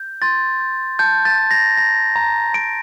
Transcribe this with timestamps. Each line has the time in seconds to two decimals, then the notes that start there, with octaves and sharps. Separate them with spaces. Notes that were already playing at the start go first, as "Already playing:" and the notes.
Already playing: G6
0.22 C6 A6
0.60 G6
0.99 A5 G6
1.25 A6
1.38 G6
1.51 A#6
1.77 A#5 A#6
2.16 A#5
2.54 A#5 D7